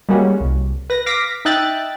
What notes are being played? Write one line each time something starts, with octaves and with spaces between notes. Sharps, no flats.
G3 G#3 A#3 C#4 F#4
C2
B4 A#6
F5 D6 A#6 B6
D#4 D#5 E5 G5 F#6 A6